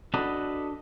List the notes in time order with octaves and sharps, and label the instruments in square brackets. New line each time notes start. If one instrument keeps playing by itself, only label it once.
[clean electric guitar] D4 F#4 A4 B4 D5 D#5